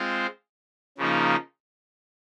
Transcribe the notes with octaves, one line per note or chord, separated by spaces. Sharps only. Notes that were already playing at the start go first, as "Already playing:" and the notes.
Already playing: G#3 C4 F4 C5
C#3 F3 A#3 D#4